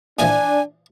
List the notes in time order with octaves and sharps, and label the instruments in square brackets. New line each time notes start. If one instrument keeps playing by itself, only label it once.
[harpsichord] A#2 E3 F3 [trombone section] D4 [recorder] G#5